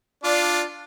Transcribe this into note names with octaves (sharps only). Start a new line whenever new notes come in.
D4 F4 D5